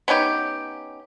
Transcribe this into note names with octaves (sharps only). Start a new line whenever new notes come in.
B3 C#4 D#4 G4